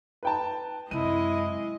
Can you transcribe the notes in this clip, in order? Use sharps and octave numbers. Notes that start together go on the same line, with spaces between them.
B4 G5 A5
F#2 C3 G#3 E4 D#5 D#7